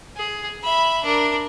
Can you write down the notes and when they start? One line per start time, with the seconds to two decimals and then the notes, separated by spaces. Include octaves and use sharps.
0.17 G#4
0.63 E5 B5
1.04 D4 A#4